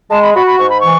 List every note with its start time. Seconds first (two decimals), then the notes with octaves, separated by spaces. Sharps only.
0.10 G#3 A5
0.22 B5
0.34 F#4 B5
0.46 B5
0.58 G#2 C#6
0.70 B5
0.80 E3 C#6